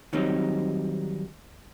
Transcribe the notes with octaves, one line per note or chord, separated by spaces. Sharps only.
D#3 F#3 G3 C4 D#4